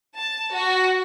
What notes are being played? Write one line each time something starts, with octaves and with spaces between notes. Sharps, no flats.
A5
F#4